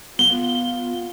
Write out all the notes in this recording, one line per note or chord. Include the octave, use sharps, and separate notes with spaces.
B3 F4 G7